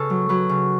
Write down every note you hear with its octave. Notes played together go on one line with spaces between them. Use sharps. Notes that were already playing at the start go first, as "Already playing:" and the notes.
Already playing: C#3 A4 B4
F#3
F#3 B4
C#3